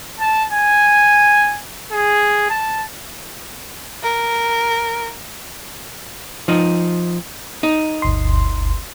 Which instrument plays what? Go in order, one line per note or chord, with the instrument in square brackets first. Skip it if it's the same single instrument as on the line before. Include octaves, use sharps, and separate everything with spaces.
[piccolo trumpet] A5
G#5
G#4
A5
[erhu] A#4
[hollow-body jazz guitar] F3 D#4
D#4
[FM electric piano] G1 D2 C6